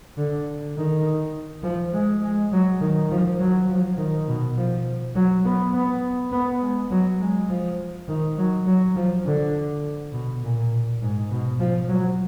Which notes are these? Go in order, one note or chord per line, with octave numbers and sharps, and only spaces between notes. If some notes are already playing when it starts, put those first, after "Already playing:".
D3
D#3
F3
G#3
G#3
F#3
D#3
F3
F#3
F3
D#3
B2
F3
F#3
B3
B3
B3
G#3
F#3
G#3
F3
D#3
F#3
F#3
F3
D3
B2
A#2
G#2
B2
F3
F#3